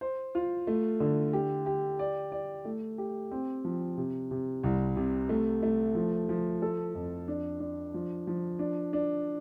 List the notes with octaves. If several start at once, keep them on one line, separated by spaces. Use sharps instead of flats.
C5
F4
A3
D3
G4
G4
D5
D5
A3
G4
C4
F3
C3
C3
C2
C3
A3
A3
F3
F3
A4
F2
D4
D4
F3
F3
D4
D4